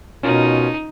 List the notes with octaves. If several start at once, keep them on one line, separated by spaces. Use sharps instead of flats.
B2 C#4 D#4 F4 A#4